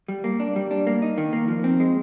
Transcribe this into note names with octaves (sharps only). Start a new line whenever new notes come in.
G3
A#3
D4
G3
D4
A#3
D#4
D#3
A#3
F3
C4
G#3